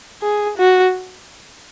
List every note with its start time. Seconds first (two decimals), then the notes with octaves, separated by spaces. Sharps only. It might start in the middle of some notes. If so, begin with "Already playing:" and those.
0.22 G#4
0.57 F#4